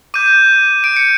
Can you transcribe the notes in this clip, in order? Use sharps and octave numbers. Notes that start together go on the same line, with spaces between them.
D6 G6 D#7
D7
C#7